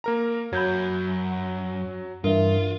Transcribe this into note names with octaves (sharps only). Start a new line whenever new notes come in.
A#3 A#4 A#5
F#2 F#3 B5 G6 G#6
G2 E3 F4 A#4 E5